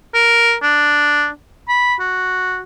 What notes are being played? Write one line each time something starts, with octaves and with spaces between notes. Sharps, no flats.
A#4
D4
B5
F#4